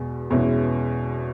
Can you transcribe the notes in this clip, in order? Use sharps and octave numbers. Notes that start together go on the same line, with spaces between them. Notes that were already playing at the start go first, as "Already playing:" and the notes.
Already playing: E2 B2 G#3
E2 B2 G#3 C#4 E4